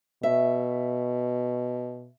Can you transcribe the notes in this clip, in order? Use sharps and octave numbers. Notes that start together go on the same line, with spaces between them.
B2 E5